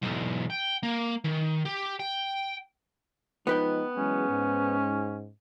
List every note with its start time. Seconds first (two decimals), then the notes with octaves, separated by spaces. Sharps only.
0.03 B1 E2
0.50 G5
0.83 A#3
1.25 D#3
1.66 G4
1.99 G5
3.47 F3 G#3 B3 D#4 B4 G5
3.95 E3 F#3 G#3 C#4
4.29 G#2